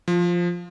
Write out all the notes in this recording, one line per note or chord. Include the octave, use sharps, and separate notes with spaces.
F3